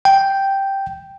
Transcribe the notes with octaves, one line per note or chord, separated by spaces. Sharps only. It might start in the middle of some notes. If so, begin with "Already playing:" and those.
G5